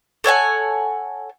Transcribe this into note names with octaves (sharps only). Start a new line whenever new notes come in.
A4 C#5 F#5 G#5